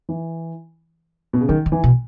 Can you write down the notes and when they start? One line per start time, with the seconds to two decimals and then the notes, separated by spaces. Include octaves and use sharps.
0.09 E3
1.33 B2
1.41 C#3
1.49 D#3 F#3
1.66 D#3
1.72 E3
1.84 B2